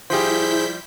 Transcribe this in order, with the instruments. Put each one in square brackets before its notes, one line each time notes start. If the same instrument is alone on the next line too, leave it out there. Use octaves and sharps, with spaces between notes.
[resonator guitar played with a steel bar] F3 G3 G4 [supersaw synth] E4 G6 B6 [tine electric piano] G#4 C5